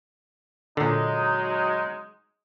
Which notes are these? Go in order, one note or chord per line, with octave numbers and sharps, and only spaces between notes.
A#2 D3 F#3 G#3 D#4